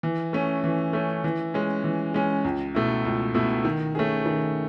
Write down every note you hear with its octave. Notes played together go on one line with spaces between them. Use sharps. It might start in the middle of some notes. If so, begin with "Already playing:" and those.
E3
A3 C#4
E3
A3 C#4
E3
G#3 C#4
E3
G#3 C#4
C#2
B2 A3 E4
C#2
B2 A3 E4
D#3
A3 C#4 G#4
D#3